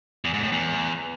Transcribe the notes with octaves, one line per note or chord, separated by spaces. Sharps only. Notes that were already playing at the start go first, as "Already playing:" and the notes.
E2
G#2
A2
E2